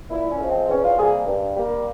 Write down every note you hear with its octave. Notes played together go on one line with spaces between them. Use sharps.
A#2 E4
C#4
F3 G#3
C4
E2 C#4
F4
C3 G3 A#3 G#4
G2
G3 A#3